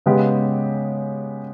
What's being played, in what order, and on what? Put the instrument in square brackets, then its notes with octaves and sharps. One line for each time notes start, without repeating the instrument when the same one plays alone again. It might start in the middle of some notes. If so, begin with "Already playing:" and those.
[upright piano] C#3 G#3 B3 G4